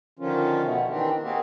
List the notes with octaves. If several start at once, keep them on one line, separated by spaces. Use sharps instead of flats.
D3 D#3 F3 C#4 F4
B2 A3 B3
D#3 E3 C4 D4 G4
G#3 A#3 C4 F#4 G4